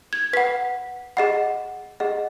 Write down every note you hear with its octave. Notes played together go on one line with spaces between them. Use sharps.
G#6
B4 F#5 B6
G#4 D#5 F#5
G#4 D#5 F#5